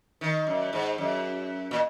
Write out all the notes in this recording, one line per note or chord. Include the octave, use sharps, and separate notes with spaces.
D#3
F#2
G#2
F#2
A#2